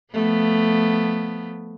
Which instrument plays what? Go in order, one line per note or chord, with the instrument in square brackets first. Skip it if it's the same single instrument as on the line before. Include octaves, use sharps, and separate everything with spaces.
[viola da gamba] F3 A3 B3